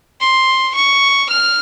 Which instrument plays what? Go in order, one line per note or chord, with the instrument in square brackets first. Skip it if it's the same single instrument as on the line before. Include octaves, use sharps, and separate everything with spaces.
[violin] C6
C#6
F6